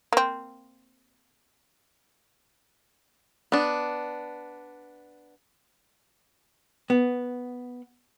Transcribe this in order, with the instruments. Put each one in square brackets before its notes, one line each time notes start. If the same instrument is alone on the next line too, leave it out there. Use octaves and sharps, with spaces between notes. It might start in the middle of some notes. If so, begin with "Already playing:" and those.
[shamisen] A#3 C4
[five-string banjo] B3 D4
[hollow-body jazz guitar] B3